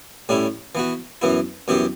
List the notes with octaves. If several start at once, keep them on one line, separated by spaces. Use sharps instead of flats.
A2 G3 C#4 E4
E3 B3 F#4
F#2 E3 B3 E4
F#2 E3 B3 E4 G4